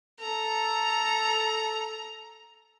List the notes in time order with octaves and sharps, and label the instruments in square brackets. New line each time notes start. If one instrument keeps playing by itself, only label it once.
[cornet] A4 [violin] A#5